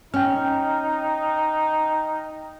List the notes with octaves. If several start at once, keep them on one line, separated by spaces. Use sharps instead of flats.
C#4 D#4 G5 F6